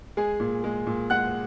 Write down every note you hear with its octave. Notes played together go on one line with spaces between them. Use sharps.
G#3 G#4 G#5
A#2
G#3
A#2
G#3 F#5 F#6